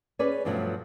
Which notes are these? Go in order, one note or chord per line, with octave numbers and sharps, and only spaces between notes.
C#4 G#4 B4 D5
G2 B2 F3 F#3 A3